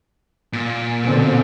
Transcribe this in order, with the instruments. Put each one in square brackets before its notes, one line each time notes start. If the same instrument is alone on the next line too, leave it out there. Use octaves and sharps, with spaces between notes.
[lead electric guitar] A#2
[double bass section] B2 D3 C4